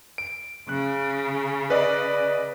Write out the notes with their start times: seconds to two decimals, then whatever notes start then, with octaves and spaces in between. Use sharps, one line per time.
0.18 D7
0.69 C#3 F#6
1.70 B4 D5 D#5